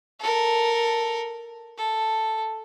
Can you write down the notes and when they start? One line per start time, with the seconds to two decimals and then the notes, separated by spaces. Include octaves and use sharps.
0.20 A4 A#4
1.78 A4